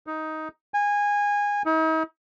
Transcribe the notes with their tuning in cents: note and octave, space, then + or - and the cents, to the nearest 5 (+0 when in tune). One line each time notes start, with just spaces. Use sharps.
D#4 +10
G#5 -20
D#4 +45